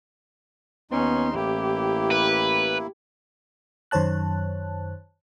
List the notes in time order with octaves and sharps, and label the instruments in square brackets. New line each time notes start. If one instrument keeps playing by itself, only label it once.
[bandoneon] D#2 D#4 C6 [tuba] B3 [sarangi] C#4
[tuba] A1 [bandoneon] A#3 E4 [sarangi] G4
[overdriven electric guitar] B4
[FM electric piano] F#2 D#3 C5 C#5 A5 F#6